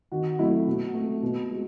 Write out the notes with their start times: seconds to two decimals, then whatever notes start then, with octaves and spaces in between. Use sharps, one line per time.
0.12 D#3 F#4
0.39 F#3 A3 E4
0.66 B2 F#4
0.94 A3
1.22 B2
1.50 G#3